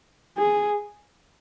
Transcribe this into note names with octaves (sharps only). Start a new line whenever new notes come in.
G#4